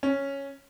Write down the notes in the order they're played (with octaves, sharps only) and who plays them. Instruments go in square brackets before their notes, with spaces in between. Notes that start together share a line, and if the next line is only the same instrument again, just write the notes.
[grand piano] C#4